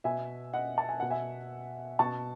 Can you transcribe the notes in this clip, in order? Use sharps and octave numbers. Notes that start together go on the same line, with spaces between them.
B2 E5 G#5
D#5 F#5
A5
G#5
B2 F#5
E5 G#5
B2 A5 C#6